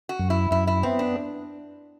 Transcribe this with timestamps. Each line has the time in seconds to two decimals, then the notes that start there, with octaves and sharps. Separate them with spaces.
0.09 F#4
0.19 F#2
0.30 E4
0.51 F#2 E4
0.67 E4
0.83 B3 C4
0.99 D4